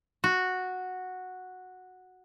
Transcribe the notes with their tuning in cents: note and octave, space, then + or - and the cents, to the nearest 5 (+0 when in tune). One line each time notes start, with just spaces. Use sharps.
F#4 -5